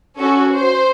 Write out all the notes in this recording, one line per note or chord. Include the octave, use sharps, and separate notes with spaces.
C#4 F#4 A4
C5